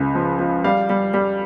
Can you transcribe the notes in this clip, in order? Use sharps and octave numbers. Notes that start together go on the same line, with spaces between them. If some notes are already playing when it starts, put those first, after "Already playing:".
Already playing: C#2 C#3
F3
F3
G3 F5
G3
G3